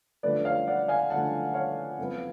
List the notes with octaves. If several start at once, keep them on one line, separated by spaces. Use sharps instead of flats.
F#2 D3 F3 A3 B4 D5
C#5 F5
D5 F#5
F5 G#5
F#2 D3 F3 A3 F#5 A5
C#5 F5
F#1 F2 F3 B3